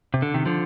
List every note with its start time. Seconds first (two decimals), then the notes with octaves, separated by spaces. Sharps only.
0.14 C3
0.22 D3
0.34 C3 D#3
0.46 D3 F3